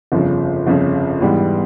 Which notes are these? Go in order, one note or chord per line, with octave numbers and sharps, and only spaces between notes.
G1 F2 C#3 F3
G1 F2 C#3 F3
G#2 E3 G3 B3